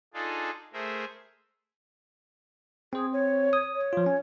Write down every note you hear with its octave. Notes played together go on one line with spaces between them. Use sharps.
D4 D#4 F4 G#4 A4
A3 G#4 A#4 C5 E5
C4 G#4 C5
C#5
D#6
C#5
F3 F4
C#4